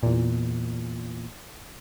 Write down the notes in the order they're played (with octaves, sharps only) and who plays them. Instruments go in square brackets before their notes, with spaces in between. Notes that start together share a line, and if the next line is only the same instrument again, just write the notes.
[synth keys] E2 A#2